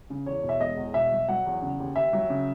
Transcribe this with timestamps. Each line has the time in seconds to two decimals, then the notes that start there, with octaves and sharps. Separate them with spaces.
0.10 C#3
0.26 E2 C#5
0.43 B2
0.49 E5
0.60 E1 D#5
0.77 E2
0.94 B2 E5
1.12 F#3
1.29 F#3 F#5
1.46 E2
1.62 C#3
1.80 D#2
1.96 D#2 E5
2.13 F#3
2.30 C#3